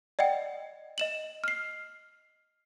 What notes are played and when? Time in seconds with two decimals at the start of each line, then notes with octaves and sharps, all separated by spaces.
0.19 D5 D#5 F#5 G5
0.98 D#5 E7 F#7
1.44 F6 C7